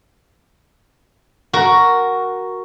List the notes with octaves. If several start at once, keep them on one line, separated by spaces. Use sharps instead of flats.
F#4 A#4